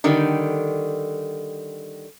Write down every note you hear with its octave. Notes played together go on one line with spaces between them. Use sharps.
D3 D#3 G3